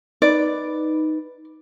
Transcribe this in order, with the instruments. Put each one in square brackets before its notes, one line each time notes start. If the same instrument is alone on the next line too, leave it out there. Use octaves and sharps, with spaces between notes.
[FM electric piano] D#4 B4 [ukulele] D5